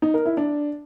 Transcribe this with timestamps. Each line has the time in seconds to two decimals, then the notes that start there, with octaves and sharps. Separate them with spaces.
0.02 D#4
0.14 A#4
0.26 E4
0.37 D4